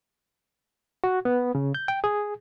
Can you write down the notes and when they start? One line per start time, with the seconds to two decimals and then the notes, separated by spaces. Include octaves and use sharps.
1.04 F#4
1.25 B3
1.55 C#3
1.75 G6
1.88 G5
2.04 G#4